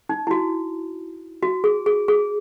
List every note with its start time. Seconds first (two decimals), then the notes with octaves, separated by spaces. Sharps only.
0.09 D#4
0.27 E4
0.31 F#4
1.43 F#4
1.64 G#4
1.86 G#4
2.08 G#4